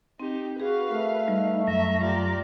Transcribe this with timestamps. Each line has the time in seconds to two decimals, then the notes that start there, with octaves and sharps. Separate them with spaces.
0.20 C4 D#4 G4
0.60 F#4 G#4 B4 F5
0.91 A3 A#4 E5
1.28 G3 D#4
1.67 F#2 E5 A#5
2.01 A3 F4 G4 D5